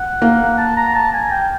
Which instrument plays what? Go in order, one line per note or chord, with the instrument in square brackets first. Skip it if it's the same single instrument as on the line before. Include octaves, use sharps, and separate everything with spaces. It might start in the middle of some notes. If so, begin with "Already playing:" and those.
Already playing: [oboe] F#5
[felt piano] A#3
[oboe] A5
A#5
A5
G#5
G5